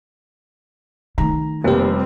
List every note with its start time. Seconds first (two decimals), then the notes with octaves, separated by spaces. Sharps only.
1.18 D#3 A3 A#5
1.64 F1 G3 A#3 C4 G4